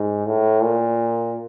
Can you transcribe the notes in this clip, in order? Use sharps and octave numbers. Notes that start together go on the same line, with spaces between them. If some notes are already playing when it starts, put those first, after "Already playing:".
Already playing: G#2
A2
A#2